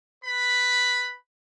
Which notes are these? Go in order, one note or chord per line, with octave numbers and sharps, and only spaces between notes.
B4 B5